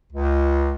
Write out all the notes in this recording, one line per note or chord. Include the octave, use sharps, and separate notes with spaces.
C#2